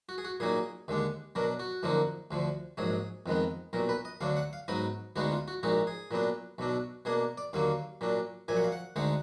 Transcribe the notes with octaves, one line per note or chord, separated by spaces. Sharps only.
F#4
G#4
F#4
A#2 F#3 A#3 D#4 G#4
D#2 D3 G#3 D4
B2 F#3 D4 A#4
F#4
F#2 D3 F3 A#3 D#4
D2 D3 F3
A#1 G#2 F#3 G#4
F2 D#3 G#3 B3
B1 A#2 F#3 A#4
B4
D#5
D2 D3 F#3 D4 F5
F#5
F5
G#2 F#3 B3 D#4 D#5
D2 D3 G#3 B3 D#4 F#4
F4
F#4
A#1 A#2 G#3 D#4 F#4
G#4
A#2 F#3 B3 D4
B1 B2 F#3 D4
B2 A#3 D4 G#4
D5
D#2 D3 F#3 A#3 F5
A#2 F#3 D4
A#1 A#2 F#3 G#5
F#5
F5
F#5
D2 D3 G#3 D#4 F#5